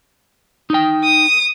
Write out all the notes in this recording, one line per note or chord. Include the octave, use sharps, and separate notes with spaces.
D#4 G5
D#6